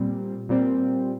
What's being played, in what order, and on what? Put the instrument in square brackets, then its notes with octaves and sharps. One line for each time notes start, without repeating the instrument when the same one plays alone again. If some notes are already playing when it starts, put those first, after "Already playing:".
Already playing: [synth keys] A#2 G3 C4
A#2 G3 C4